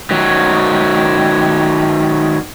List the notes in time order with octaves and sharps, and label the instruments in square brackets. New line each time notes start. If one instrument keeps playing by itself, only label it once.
[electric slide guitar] D#3 F#3